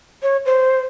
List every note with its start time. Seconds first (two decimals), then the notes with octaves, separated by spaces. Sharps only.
0.23 C#5
0.46 C5